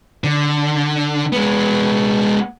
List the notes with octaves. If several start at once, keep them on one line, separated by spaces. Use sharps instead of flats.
D3
G#3 B3